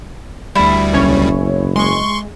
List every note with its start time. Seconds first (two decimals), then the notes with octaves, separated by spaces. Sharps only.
0.55 D2 G3 E4
0.93 F#1 B1 C#4 C#5
1.76 G#3 C6 C#6